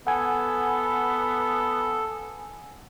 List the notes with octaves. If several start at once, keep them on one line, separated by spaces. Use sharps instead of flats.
B3 A4 F#5 G#5